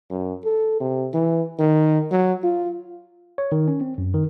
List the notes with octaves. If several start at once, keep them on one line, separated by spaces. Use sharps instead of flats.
F#2
A4
C3
E3
D#3
F#3
F4
C#5
D#3
C#4
C4
F#2
D#3